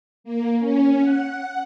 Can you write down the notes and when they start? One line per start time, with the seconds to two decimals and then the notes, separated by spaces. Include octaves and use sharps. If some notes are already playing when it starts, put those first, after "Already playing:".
0.24 A#3
0.60 C#4
1.01 F#5